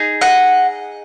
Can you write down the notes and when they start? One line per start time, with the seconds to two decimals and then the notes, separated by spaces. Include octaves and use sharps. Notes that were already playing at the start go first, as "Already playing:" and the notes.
Already playing: D#4 G#4
0.21 D#5 F#5